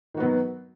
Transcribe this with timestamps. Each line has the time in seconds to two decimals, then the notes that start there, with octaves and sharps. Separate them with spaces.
0.14 D#3
0.17 F#4
0.20 B3
0.23 F#3